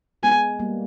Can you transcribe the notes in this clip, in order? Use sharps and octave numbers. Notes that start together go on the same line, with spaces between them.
G#3 B3 G#5
G3 A#3